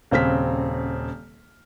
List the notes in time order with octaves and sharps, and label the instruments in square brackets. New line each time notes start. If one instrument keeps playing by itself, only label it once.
[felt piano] D#1 C#3 C4 F6 B6